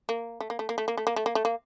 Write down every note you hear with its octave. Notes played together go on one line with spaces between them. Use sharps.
A#3
A3
A#3
A3
A#3
A3
A#3
A3
A#3
A3
A#3
A3
A#3